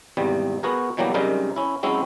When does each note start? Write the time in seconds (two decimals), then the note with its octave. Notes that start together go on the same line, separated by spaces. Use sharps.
0.17 G#1 E2 C3 G3
0.63 B3 F#4 G#4 A#4
0.97 B2 E3 F#3 G3 A#3 G4
1.14 F#2 C3 G3 G#3 D#4 A#4
1.56 C#4 E4
1.83 F#3 G#3 C4 C#4 E4